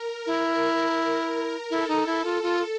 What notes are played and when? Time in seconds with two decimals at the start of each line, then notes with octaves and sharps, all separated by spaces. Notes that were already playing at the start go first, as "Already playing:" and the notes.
Already playing: A#4
0.26 E4
1.70 E4 A4
1.88 D#4
2.06 E4
2.25 F4
2.43 F4